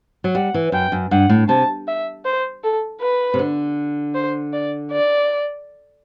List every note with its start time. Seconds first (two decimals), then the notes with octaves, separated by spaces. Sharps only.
0.24 F#3
0.35 G3 F#5
0.54 E3
0.72 F#2 G5
0.92 F#2
1.11 G2 F#5
1.29 A2
1.48 C3 A5
1.87 E5
2.25 C5
2.64 A4
3.00 B4
3.34 C3
3.39 D3
4.14 C5
4.53 D5
4.91 D5